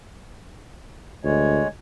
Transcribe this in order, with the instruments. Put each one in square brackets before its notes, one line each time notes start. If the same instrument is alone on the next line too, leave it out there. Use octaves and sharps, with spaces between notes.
[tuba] D2 [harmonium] G#3 C#5